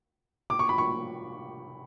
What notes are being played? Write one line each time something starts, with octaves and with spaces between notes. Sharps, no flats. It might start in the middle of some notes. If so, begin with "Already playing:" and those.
D6
C#6
B5
C#6